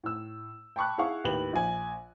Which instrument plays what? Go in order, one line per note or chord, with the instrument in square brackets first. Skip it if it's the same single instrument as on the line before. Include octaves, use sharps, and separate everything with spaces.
[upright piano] A2 E6
G5 A5 B5 C#6 D6 F#6
E4 G#4 F5 F#5 C#6
D#2 A2 B4 F#7
A#1 G#5